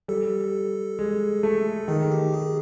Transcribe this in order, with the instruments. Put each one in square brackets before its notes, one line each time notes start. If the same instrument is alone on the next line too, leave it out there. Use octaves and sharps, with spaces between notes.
[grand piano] G3 [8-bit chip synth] A4
[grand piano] G#3
A3
[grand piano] D#3 [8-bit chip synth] G#4
[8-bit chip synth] G4
G#4